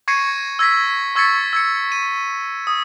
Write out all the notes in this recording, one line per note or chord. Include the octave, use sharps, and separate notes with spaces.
C#6 G#6 A#6 C7 C#7 D#7
E6 G#6 A#6 B6
C#6 E6 G#6 A6 B6 C#7
E6 G#6 C#7
D#7
D#6